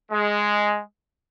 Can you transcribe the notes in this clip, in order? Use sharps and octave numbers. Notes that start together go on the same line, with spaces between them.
G#3